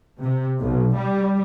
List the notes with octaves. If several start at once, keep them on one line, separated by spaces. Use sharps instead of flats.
C3
B1
G3